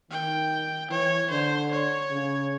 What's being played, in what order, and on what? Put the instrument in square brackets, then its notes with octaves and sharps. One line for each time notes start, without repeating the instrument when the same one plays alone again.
[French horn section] D#3 [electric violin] G5
[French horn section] E3 [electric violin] C#5
[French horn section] D3 [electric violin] C5
[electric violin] C#5
[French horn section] C#3